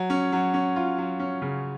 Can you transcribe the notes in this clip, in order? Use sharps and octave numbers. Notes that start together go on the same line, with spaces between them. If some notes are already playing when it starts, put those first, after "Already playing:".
Already playing: F#3
C#4
F#3
C#4
F4
F#3
C#4
C#3